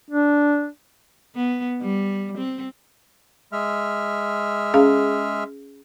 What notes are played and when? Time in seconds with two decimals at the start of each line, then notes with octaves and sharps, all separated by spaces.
0.10 D4
1.36 B3
1.82 G3
2.38 C4
3.52 G#3 E5 F6
4.74 C#4 G#4 F5